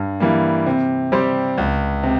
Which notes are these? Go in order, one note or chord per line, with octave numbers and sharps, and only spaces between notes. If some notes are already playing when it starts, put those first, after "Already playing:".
Already playing: G2
E3 G3 A#3
C3
G3 C4 G4 C5
C#2
C3